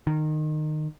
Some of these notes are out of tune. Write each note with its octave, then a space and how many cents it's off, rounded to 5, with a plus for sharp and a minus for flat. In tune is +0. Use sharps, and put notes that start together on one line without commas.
D#3 -20